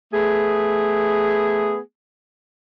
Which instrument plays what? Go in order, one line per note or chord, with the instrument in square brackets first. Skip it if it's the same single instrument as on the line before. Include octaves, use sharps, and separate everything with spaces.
[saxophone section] A3 B3 G#4